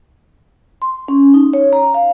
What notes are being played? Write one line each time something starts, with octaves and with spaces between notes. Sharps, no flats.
C6
C#4
D#4
C#5
A#5
F5